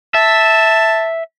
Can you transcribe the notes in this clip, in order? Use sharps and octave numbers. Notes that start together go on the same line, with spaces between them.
E5 A5